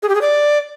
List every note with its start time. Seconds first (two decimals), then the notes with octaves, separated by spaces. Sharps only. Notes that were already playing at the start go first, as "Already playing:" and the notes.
0.03 G#4
0.09 G4
0.15 G#4
0.21 D5